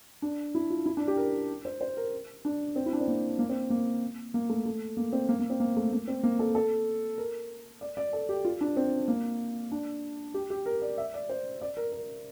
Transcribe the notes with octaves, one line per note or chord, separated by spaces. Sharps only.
D4
E4
F4
E4
D4
G4
A#4
C5
C5
A#4
D4
C4
E4
D4
C4
A#3
A#3
C4
A#3
A#3
A3
A3
A#3
C4
A#3
A#3
C4
A#3
A3
A#3
C4
A#3
A4
A4
A#4
D5
D5
A4
G4
F4
D4
C4
A#3
D4
G4
G4
A#4
D5
E5
D5
C5
D5
A#4
A#4